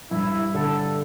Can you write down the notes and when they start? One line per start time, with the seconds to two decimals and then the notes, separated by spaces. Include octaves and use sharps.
0.11 G2 E4
0.54 D3 A4